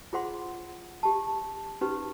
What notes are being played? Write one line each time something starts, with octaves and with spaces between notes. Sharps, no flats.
F4 G#4 C5 F#5 C6
G4 A5
C#4 D#4 F#4 G4 B4 C5